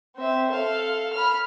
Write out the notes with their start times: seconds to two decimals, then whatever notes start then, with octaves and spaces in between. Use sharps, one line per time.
0.16 C4 E5
0.50 A4 F5
1.13 B5 F6